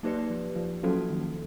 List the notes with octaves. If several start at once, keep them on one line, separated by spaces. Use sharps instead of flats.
F#3 A#3 D#4 G4 B4 D5
F3
F3
F3 F#3 A#3 C#4 F#4 A4
D#3